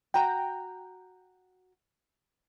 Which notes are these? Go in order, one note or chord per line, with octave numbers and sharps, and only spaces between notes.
F#4 G5 A#5